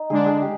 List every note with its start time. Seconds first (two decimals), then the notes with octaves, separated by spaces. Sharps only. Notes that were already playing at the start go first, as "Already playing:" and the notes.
Already playing: D#4
0.10 D3 G#3 D4 G#4
0.26 G#4
0.42 G4